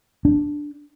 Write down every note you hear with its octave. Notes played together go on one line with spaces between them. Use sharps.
D4